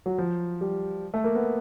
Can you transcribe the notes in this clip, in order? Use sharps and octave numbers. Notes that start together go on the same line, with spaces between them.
F#3
F3
G3
A3
A#3
B3